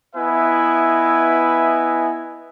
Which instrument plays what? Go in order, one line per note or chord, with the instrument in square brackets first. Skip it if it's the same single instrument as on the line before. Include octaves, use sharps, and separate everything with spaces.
[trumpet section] B3 E4 B4 D#5 E5 G#5